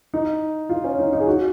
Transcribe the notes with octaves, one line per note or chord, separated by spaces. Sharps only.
D#4
F4
C#4
D#4
D#4
G#4
F#4